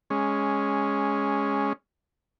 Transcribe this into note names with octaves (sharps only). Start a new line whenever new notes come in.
G#3 C#4